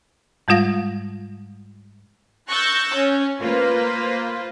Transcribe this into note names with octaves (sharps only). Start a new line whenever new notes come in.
G#2 G3 G#3 F4 F5 A#6
C#6 E6 F#6 G6 A6 A#6
C#4
A#3 F4 B4 C5